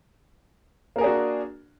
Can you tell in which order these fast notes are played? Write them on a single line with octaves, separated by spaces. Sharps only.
A#3 A#4 G#4 D4 F#4